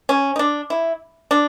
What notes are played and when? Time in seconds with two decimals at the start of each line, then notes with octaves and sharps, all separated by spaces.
0.09 C#4
0.36 D#4
0.39 D4
0.70 E4
1.31 D4